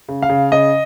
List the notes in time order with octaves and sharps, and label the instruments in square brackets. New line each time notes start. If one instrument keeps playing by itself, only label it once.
[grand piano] C#3
F5
C#3
C#3 D#5